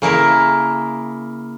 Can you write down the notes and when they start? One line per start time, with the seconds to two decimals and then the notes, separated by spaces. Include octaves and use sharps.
0.02 C#3 A#3 E4 A#4